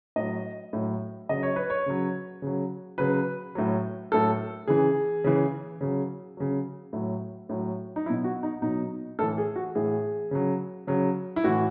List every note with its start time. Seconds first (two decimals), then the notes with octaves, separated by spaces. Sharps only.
0.16 A2 F#3 D#5
0.73 A2 F#3
1.29 C#3 F#3 D#5
1.43 C#5
1.56 B4
1.70 C#5
1.86 C#3 F#3
2.42 C#3 F#3
2.98 C#3 F#3 B4
3.55 A2 F#3
4.12 A2 F#3 A4
4.67 C#3 E3 G#4
5.24 C#3 E3
5.81 C#3 F#3
6.37 C#3 F#3
6.93 A2 F#3
7.49 A2 F#3
7.96 D#4
8.06 F#3 E4
8.10 B2
8.24 F#4
8.43 D#4
8.62 B2 F#3 D#4
9.19 A2 A4
9.23 E3
9.38 G#4
9.56 F#4
9.75 A2 E3 G#4
10.31 C#3 F#3
10.87 C#3 F#3
11.36 E4
11.44 A2 E3 F#4